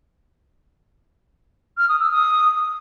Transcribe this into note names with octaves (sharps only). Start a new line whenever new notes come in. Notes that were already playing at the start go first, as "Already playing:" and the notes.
F6
D#6
E6
D#6